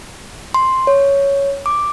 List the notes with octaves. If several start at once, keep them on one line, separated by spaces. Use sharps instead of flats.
C6
C#5
D6